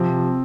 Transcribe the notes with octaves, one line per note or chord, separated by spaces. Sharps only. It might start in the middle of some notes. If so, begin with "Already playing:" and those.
Already playing: C3 F3 C4